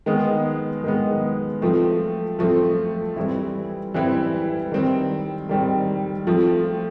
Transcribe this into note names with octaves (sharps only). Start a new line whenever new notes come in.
D#3 G#3 B3
D#3 G#3 B3
F3 A3 C4
F3 A3 C4
E3 G3 C4 E4
E3 G3 C4 E4
D#3 G3 C4
D#3 G3 C4
F3 A3 C4